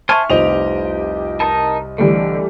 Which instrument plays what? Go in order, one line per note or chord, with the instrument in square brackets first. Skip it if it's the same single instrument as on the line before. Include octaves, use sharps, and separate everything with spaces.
[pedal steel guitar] C5 G#5 A5 [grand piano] E5 C#6 F6
[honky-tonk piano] F1 F4 F7 [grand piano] C2 C5 D#5 [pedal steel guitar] G4
[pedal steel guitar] D#4 A#4 A5
[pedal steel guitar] D3 [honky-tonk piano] E3 G3 A3